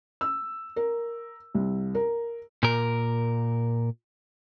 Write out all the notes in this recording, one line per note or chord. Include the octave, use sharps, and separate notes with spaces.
E6
A#4
C2
A#4
A#2 A#4